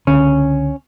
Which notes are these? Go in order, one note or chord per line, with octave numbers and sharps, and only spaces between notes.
C#2 D3 C#4